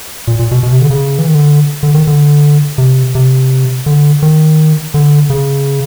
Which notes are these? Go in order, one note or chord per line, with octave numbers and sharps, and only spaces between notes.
A#2
A#2
B2
B2
C3
D3
C#3
E3
D#3
D3
D3
D#3
D3
C3
C3
D3
D#3
D3
C#3